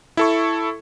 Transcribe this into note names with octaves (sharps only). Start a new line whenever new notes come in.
E4 A4 C#6